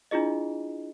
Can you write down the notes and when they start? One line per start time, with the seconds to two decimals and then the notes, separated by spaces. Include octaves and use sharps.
0.11 D4 E4 F4 G#4 D#5